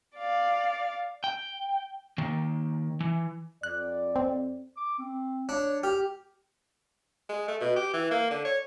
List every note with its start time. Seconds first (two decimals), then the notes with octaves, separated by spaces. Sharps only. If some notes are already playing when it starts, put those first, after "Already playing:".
0.16 D5 F5
1.24 G5
2.18 D#3 A#3
3.00 E3
3.63 F2 D5 F#6
4.16 C4
4.77 D6
4.99 C4
5.49 D4 C#5
5.83 G4 F6
7.29 G#3
7.48 A3
7.60 B2
7.76 G4
7.93 E3
8.11 A#3
8.31 D3
8.45 C#5